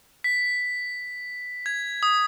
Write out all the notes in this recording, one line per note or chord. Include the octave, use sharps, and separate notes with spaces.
B6
G#6
D#6